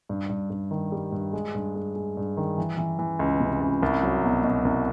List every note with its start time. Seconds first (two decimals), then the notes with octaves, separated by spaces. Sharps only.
0.09 G2
0.29 G2
0.50 G2
0.71 D#3
0.92 G3
1.12 G2
1.33 G#3
1.55 G2
1.75 G#3
1.96 G#3
2.17 G2
2.37 D#3
2.58 E3
2.78 E3
2.99 E3
3.19 C#2
3.40 C3
3.61 C#2
3.82 C2
4.03 F#3
4.24 B2
4.44 B2
4.65 C2